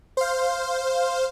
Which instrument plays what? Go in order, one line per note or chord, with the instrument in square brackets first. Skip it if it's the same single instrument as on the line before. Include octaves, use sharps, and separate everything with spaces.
[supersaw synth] C5 F5